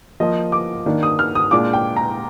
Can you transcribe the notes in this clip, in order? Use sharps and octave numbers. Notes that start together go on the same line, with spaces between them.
F3 A#3 F4 D#5
D6
D#3 A#3 D4
D#6
F6
D#6
A#2 G#3 D4 F4 D6
G5
A#5